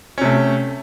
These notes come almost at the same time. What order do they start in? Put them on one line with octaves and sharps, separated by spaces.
C#4 C3 A3